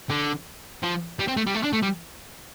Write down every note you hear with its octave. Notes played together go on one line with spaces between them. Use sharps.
D3
F3
G3
C4
A3
G3
A3
D4
A3
G3